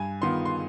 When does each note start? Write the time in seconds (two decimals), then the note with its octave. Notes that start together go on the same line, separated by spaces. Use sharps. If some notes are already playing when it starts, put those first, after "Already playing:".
Already playing: G2 G#5
0.22 D#3 B3 F4 C6
0.45 C6